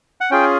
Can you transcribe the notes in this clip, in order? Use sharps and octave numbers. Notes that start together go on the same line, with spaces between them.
F#5
C#4 F4 G#4 G5